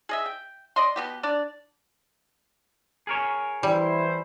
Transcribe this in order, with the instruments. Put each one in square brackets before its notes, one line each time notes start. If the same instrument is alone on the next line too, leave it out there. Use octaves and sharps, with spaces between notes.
[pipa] G#4 D#5 E5
G5
D5 D#5 C6
B2 B3 G4
D4 D5
[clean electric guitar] G#4 A#4 C#5
[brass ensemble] E3 E4 C5 [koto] G3